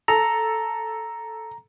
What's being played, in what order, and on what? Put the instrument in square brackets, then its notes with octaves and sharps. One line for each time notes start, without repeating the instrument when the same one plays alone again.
[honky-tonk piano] A4 [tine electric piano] A#5